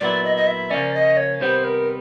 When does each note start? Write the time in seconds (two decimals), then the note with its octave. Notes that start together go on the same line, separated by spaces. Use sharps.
0.01 A#2 F#3 B3 E4 D5
0.25 D#5
0.37 D#5
0.47 E5
0.70 C#3 F3 A#3 C#4 D5
0.95 D#5
1.17 C#5
1.41 C3 D#3 G3 B3 C5
1.64 A#4